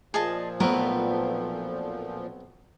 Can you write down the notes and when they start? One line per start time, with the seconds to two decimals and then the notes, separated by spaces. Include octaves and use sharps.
0.14 A#2 F3 G#4 D#5 A5
0.60 B1 A3 B3 C4 A#4 B4